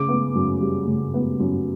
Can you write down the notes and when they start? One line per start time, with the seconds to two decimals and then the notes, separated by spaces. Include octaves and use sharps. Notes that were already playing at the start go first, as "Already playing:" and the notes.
Already playing: C#3 D6
0.08 B3
0.35 F#2
0.61 G3
0.87 C#3
1.14 B3
1.40 F#2